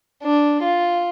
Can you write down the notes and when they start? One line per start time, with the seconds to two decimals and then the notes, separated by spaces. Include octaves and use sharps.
0.23 D4
0.63 F4